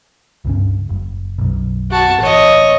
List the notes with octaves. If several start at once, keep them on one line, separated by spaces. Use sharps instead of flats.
C#2 G2 C#4
F#1
B1 F#2
F#4 A5
A1 C#5 D#5